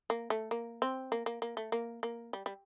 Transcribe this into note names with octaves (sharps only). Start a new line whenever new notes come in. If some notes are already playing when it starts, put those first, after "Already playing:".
A#3
A3
A#3
C4
A#3
A#3
A#3
A3
A#3
A#3
G3
G3